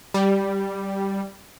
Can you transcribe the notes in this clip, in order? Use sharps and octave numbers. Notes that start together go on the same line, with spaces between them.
G3